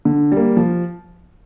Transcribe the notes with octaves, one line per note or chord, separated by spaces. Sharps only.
D3
G3 A#3
F3